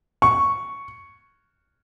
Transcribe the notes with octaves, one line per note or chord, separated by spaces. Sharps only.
C#6